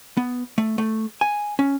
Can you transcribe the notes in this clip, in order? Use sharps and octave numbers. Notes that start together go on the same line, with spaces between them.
B3
A3
A3
G#5
C#4